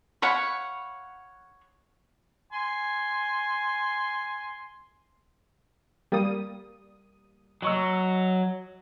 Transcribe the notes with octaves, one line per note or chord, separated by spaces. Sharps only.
C#5 F5 F#5 B5
G#5 C6
G3 A#3 D#6
F#3 D#5 C#6 E6